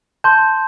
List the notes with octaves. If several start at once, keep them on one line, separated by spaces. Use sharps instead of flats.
A5 C6 G6